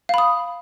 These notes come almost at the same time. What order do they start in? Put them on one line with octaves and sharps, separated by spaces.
F5 B5 D#6